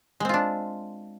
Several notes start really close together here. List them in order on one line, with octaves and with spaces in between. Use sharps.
G#3 C4 F4 D4